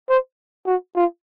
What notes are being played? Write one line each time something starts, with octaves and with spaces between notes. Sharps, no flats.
C5
F#4
F4